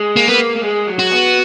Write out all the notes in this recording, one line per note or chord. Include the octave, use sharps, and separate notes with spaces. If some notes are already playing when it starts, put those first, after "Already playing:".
Already playing: G#3
A#3
A#3 B3
A#3
G#3
F#3
F#4
B3